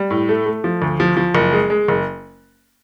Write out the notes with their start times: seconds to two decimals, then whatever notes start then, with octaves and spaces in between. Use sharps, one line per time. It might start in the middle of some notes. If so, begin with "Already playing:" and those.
Already playing: G3
0.11 A2
0.29 A3
0.46 A3
0.64 F3
0.82 D2
1.00 F3
1.17 F3
1.35 F#1
1.53 G#3
1.70 G#3
1.88 F#1